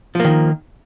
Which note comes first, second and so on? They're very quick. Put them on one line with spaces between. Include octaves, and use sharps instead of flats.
F3 A#3 D#3